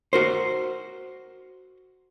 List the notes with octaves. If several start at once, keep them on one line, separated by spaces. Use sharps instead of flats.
F#4 A#4 C5